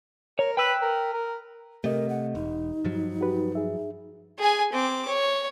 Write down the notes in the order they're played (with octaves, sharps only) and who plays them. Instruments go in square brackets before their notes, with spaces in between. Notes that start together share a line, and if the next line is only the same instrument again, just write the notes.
[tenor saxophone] A#4 [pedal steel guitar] C#5
[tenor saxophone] B4 [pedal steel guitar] G5 E6 F#6
[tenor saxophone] A#4
A#4
[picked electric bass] C3 A3 [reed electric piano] G4 D#5 [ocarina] A#4
[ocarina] F#5
[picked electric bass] E1 [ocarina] D#4
[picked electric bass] G2 F3 F#3
[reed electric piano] F#4 G4 B4
G#4 E5
[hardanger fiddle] G#4 G#5
C4 D6
C#5